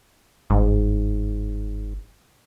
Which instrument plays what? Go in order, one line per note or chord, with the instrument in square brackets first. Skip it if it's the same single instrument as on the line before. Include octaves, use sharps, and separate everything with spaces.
[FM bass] G1 [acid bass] G#2